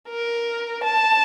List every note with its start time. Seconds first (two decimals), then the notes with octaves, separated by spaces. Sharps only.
0.09 A#4
0.84 A5